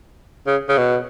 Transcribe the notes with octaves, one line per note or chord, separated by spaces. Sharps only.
C#3
C#3
B2